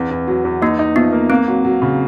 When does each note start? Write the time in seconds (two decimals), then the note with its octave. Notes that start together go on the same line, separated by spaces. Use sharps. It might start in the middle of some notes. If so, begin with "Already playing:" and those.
Already playing: E2 C4
0.11 E2
0.27 F#3
0.45 E2
0.62 A#3 D#4
0.79 D#4
0.96 F3 B3
1.13 A#3
1.30 A#3 C4
1.48 F#3
1.65 F#3
1.82 C#3